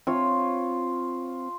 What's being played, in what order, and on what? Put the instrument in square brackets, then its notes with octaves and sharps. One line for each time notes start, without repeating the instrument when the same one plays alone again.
[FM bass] C4 [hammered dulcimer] F4 C#5